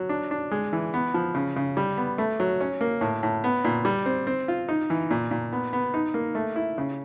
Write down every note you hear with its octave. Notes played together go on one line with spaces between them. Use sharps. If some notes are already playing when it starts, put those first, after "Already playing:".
Already playing: F#3
D4
D4
G#3
E3
B3
F3
C#3
C#3
G3
B3
A3
F#3
C#4
A#3
A2
A2
B3
A#2
G3
C4
C4
F4
D#4
E3
A#2
A#2
B3
B3
D#4
A#3
A3
E4
C#3